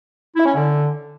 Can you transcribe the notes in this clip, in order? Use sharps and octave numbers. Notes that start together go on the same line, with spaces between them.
E4
C#4
D3